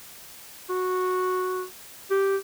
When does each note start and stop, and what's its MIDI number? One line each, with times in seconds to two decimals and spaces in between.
0.69 1.64 66
2.10 2.37 67